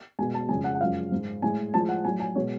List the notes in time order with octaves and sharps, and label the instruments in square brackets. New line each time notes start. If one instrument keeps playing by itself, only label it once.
[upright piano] B2 G#3 G#5
A5
F2 C#3 G#3 G#5
F#5
F#5
F#2 F3 G#3 F5
G#2 G#3
A2 G#3 G#5
A2 F3 G#3 A5
F#5
A2 F#3 G#5
G#5
B2 G#3 C#5